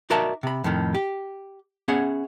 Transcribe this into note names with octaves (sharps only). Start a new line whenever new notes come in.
D#4 F#4 A#4 D5 E5 A5
C3 B5
F2 A2 D#3
G4
B3 C#4 G#4 C#5 E5 F#5